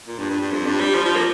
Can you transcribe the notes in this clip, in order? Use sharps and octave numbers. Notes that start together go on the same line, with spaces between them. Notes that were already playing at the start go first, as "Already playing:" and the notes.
A#2
G2
G2
G2
F2
G2
G3
F3
F3
A#3